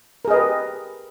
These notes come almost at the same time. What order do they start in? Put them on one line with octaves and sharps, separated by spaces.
A#4 G#4 D#5 B4 G4